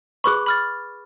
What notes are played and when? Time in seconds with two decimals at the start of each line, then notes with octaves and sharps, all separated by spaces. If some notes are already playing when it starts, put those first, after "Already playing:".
0.24 G#4 B4 B5 C#6 D6 F#6
0.46 B5 F6 A6